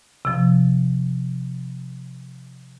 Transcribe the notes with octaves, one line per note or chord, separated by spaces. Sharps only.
C3 F3